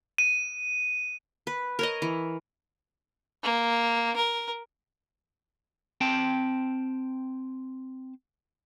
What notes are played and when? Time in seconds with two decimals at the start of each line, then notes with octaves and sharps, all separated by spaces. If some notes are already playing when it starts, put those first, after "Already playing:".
0.18 D#7
1.47 B4
1.79 A#4 C#5 D#5
2.02 E3
3.43 A#3
4.16 A#4
6.01 C4 G5 A5